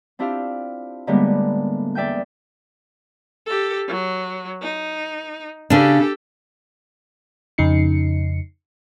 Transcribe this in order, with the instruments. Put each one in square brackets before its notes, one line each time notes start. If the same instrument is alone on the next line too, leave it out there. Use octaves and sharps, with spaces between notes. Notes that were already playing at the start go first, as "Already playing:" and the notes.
[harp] C4 D4 E4 F4 G4 F5
A2 D3 G3 G#3 A#3 B3
E2 D5 E5 G5 G#5 G6
[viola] G4 A4
F#3
D#4
[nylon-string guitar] C#3 D4 [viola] G4 A4
[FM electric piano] F2 C#3 D#4 C7 C#7